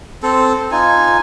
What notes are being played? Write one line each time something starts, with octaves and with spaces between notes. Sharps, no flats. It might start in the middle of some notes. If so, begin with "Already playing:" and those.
C4 A4
D#4 F4 G#5